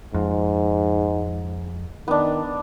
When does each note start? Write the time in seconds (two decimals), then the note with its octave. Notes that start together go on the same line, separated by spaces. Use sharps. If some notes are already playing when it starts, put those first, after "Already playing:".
0.14 F2 G#2
2.08 D#3 B3 D4